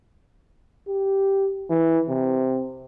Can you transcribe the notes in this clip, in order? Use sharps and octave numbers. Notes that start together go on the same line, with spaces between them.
G4
E3
C3